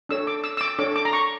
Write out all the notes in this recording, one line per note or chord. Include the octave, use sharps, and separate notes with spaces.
D4 A4 C#5 E6
D6
E6
E6
D6
D4 A4 C#5 D6
D6
A#5
C#6